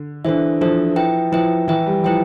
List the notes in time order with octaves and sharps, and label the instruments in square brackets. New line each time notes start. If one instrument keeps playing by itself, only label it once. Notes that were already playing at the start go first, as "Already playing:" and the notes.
Already playing: [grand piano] D3
[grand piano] E3 [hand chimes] D4 A4 C5 E5
[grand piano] F3 [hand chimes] D4 A4 C5 E5
[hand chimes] E4 B4 E5 G5
[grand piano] F3 [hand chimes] E4 B4 E5 G5
[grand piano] E3 [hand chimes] E4 B4 E5 G5
[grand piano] G3
[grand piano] F3 [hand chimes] E4 B4 E5 G5